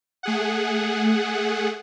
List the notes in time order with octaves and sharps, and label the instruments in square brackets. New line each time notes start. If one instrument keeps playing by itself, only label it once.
[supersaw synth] A3 G#4 F#5